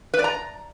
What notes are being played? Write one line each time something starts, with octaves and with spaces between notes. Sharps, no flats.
B4
D5
A#5